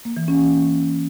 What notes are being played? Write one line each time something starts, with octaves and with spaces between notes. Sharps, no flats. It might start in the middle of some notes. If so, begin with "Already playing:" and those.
A#3
E3
C#4